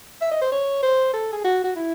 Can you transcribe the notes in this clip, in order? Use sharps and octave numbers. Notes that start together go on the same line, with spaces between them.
E5
D#5
C5
C#5
C5
A4
G#4
F#4
F#4
E4